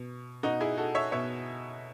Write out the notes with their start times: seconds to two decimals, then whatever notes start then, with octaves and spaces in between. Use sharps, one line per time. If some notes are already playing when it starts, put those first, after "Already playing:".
Already playing: B2
0.43 B2 D#4 F#4
0.60 E4 G#4
0.77 F#4 A4
0.95 C#5 E5
1.12 B2 C#5 E5